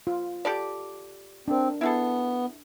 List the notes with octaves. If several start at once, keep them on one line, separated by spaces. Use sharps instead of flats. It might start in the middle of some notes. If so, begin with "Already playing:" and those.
F4
G4 A4 D5
C4 D4 A#4
B3 E4 G#4 A4